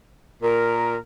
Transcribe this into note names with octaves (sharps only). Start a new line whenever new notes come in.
A#2 A#4